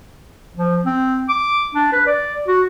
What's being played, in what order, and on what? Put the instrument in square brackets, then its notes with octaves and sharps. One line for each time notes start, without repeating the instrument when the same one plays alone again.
[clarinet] F3
C4
D6
D4
B4
D5
F#4